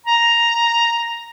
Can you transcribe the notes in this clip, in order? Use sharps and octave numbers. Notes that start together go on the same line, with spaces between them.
A#5